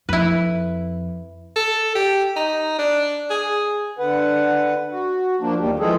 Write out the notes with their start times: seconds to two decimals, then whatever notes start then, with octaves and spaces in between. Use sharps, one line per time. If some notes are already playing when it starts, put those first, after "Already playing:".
0.09 F2 E4 B4
1.56 A4
1.95 G4
2.36 D#4
2.79 D4
3.30 G#4
3.99 D3 B4 F#5
4.92 F#4
5.41 F3 A#3 D4
5.57 D#2 G3
5.80 E3 F3 G#3 G#4 A4